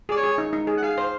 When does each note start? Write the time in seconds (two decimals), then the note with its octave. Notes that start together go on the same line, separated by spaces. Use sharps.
0.09 G#4 D5
0.17 C#5
0.23 G#4
0.38 D#4
0.53 D#4
0.67 G#4
0.78 F#5
0.83 G#4 F5
0.98 C5